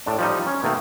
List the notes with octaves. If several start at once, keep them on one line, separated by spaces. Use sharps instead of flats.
A2 D4
F3 G3 D#4
C#4
B2 D#3 A3 A#3